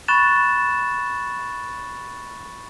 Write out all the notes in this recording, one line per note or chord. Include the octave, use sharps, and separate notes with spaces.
B5 C#6 F#6 A6 E7